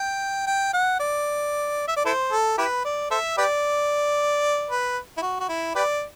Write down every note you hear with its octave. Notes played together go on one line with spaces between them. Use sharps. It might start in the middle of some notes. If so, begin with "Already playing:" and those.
Already playing: G5
G5
F#5
D5
E5
D5
E4 A4 C5
A4
E4 G4 B4
D5
A4 C5 E5
G4 B4 D5
B4
E4
F#4
F#4
E4
G4 B4 D5